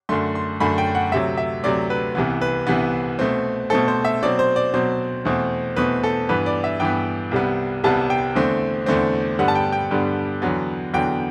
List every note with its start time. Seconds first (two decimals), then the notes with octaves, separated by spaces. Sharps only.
0.09 F#2 D3 A3 C6
0.35 C6
0.60 F#2 D3 A3 B5
0.78 G5
0.95 F#5
1.12 D2 C3 F#3 E5
1.37 E5
1.63 D2 C3 F#3 D5
1.90 B4
2.15 C2 C3 E3 B3
2.41 B4
2.67 C2 C3 E3 B3
3.19 B2 A3 C4
3.70 B2 A3 C4 A4
3.88 C5
4.05 E5
4.22 B2 F#3 C4 D5
4.39 C5
4.56 D5
4.74 B2 F#3 C4 C5
5.25 E2 B2 A3 C4
5.76 E2 B2 A3 C4 B4
6.04 A4
6.29 G2 E3 B3 B4
6.46 D5
6.64 E5
6.80 G2 E3 B3 G5
7.31 C2 C3 G3 B3
7.84 C2 C3 G3 B3 A5
8.10 G5
8.35 E2 D3 A3 C4
8.86 E2 D3 A3 C4
9.39 G2 D3 G3 B3 F#5
9.48 A5
9.55 G5
9.72 G5
9.91 G2 D3 G3 B3
10.42 E2 D3 F#3 B3
10.93 E2 D3 F#3 B3 G5